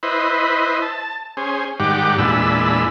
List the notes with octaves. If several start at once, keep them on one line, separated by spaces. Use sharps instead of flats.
E4 B4 C5 D#5
A5
C#4 G#4 C5
G#2 D#3 G3 G4 F#5 D6
E2 A#2 G#3 D4 B5 E6